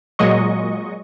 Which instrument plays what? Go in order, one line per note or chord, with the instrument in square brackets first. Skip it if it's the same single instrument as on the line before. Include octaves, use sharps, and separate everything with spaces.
[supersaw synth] A#2 F#3 G#3 D#5 C#6